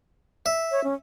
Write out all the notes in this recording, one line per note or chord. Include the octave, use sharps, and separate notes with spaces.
E5
C#5
C#4